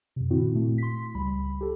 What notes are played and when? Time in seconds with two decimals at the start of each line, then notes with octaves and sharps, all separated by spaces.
0.16 F#2 C3
0.30 A#2 D#3 C4 E4 F#4
0.54 A#2 A3
0.78 C6 B6
1.15 C#2 G3 B5
1.61 G4 A4